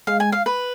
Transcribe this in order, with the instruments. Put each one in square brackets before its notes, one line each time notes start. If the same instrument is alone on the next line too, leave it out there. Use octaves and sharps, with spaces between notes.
[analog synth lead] G#3 [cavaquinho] F5
[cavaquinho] G#5
F5
B4